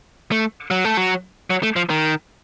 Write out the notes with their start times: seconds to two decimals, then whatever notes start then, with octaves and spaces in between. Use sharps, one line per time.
0.32 A3
0.71 F#3
0.85 A3
0.97 F#3
1.50 F#3
1.63 A3
1.76 F3
1.90 D#3